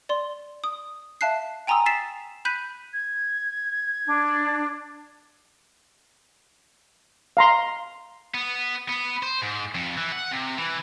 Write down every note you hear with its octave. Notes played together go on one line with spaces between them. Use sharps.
D5 C6
D#6
E5 F5 A5 F#6 C7
G5 G#5 A#5 C6 D#6 E6
E6 A6 B6 C7 E7
B5 F#6 G6 B6 D#7
G#6
D4
F5 A#5 C6
B3
B3
C5
G#2
F2
E3
F#5
C3
E3